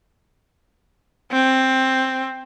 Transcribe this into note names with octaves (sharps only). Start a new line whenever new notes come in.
C4